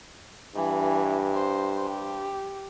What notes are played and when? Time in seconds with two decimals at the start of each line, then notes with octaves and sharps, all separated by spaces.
0.56 G2 E3
1.35 C5
1.90 G4